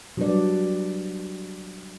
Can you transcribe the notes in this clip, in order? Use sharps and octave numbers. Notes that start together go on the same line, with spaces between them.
F#3 G3 D4 G4 B4 D5